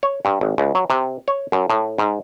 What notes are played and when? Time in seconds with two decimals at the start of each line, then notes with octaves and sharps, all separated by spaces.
0.03 C#5
0.25 G2
0.41 G#1
0.58 C#2
0.75 F#3
0.90 C3
1.28 C#5
1.52 F#2
1.70 A2
1.98 G#2